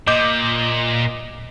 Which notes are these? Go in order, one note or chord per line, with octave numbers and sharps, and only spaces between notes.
A#2 D#5 D6 G6